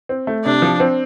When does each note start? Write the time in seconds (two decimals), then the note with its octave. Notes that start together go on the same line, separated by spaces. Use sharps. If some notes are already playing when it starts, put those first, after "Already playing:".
0.09 C4
0.27 A3
0.44 C3 D4
0.62 F3
0.80 C4